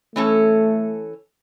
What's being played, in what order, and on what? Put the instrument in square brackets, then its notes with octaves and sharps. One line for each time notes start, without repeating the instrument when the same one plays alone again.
[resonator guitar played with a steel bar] E3 C#4 A4 [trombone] A3